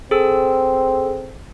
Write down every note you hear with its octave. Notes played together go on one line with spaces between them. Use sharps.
C4 G#4 A4 E6